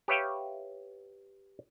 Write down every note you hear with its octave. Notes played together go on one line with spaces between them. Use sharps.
G4 B4 C#5 E5 F5 G5